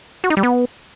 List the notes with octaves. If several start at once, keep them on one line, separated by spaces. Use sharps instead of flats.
F#4
D#4
G3
B3